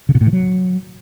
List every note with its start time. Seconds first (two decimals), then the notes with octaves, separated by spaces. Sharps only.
0.09 C#3
0.15 B2
0.21 A2
0.27 D#3
0.33 F#3